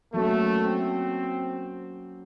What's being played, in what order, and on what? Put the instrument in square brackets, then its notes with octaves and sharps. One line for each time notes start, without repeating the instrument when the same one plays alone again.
[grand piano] F#3 A#3 C#4 F#4 A4 [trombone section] A3
[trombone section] C4